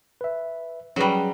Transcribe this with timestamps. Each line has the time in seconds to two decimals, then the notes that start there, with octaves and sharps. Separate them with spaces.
0.21 B4 E5
0.96 F#3 G3 C#4 G#4 B4